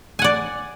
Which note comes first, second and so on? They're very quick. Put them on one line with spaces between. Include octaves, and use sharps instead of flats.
G#5 F#5 D5